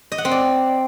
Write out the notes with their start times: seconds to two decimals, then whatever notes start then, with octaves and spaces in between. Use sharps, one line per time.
0.12 D#5
0.18 F#5
0.25 C4
0.31 D5